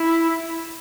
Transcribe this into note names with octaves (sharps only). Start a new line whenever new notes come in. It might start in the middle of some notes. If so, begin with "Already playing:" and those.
Already playing: E4